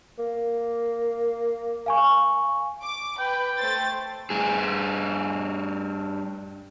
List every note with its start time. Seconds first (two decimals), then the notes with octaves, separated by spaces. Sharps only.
0.19 A#3
1.86 F5 G#5 C#6
2.83 D6
3.19 B4 G5
3.58 A3 C5 A6
4.30 G2 G#4